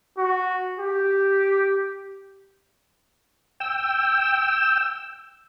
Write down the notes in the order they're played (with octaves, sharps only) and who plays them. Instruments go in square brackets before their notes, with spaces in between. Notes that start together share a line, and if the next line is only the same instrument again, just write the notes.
[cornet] F#4
G4
[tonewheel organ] G5 E6